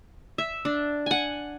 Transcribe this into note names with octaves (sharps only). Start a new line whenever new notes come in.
E5
D4
F#5 G#5